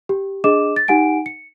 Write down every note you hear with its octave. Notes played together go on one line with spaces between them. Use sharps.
G4
D4 G#4 D#5 D6 E7
A6
D#4 G4 F#5 G#5 D7
C#7